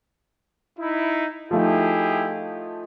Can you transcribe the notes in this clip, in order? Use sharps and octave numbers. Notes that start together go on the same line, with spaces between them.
D#4 E4
F3 A3 D#4 E4 G4 G#4